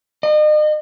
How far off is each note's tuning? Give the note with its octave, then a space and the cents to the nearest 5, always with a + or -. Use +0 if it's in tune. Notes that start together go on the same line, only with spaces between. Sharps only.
D#5 -40